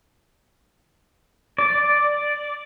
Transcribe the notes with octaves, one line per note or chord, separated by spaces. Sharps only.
D5